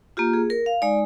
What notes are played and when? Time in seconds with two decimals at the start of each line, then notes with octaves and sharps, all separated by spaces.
0.17 A#3 F4 G4
0.33 G#4
0.50 A#4
0.66 F5
0.82 G#3 D#4 D5